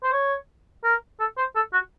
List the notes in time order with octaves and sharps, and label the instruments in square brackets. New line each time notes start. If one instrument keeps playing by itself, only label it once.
[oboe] C5
C#5
A#4
A4
C5
A4
F#4